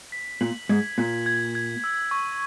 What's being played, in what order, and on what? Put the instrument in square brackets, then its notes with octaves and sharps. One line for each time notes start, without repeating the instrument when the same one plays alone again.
[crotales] B6
[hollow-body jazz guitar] A#2 [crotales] F#7
[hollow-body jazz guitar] G#2 [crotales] G#6
[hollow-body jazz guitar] A#2 [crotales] B6
[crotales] G#6
G#6
E6
C#6